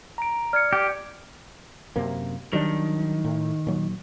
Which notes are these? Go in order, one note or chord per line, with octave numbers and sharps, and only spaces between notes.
A#5 D7
D5 F6 G#6 C#7
G4
F#2 C3 A#3
D#3 F#3 G3 D4
A2
A#2 F#3